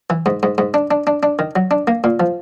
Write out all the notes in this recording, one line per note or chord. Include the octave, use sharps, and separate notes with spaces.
E3
G#2
G#2
G#2
D4
D4
D4
D4
D#3
F#3
D4
A#3
A#2
F3